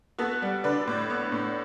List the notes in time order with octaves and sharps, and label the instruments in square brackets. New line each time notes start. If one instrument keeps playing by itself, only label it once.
[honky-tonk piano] B3 F#4 A4
G3
D3 B4 D5
A2
B3
A2